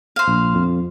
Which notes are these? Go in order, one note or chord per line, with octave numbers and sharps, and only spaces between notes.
C5 F5
A#1
F2